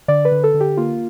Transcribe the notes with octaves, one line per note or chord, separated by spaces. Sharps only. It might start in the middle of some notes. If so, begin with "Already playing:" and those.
D3 D5
B4
D3
A4
D3
G4
A#3 F4